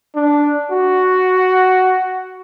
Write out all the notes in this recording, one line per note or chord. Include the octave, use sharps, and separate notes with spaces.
D4
F#4